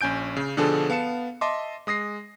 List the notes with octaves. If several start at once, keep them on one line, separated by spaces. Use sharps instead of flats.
A#1 C#4 G#5 G6 D7
C#3
B2 D3 F3 D4 G#4 A4
B3 F5 A5 C#7 E7
D#5 E5 A5 C6 D6
G#3 D#6 A#6 C7